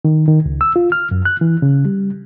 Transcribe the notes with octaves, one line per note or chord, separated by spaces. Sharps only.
D#3
D#3
C#2
E6
F4
F6
F#2
F#6
E3
C#3
G3